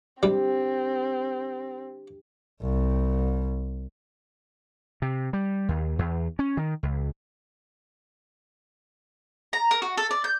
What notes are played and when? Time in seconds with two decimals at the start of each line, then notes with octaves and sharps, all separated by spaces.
0.23 G3 C4 D4 G4
2.61 C2
5.02 C3
5.33 G3
5.69 D#2
5.99 E2
6.39 C#4
6.57 D#3
6.83 C#2
9.53 A#5
9.71 A#4
9.82 F#4
9.97 A4
10.11 D5
10.24 G6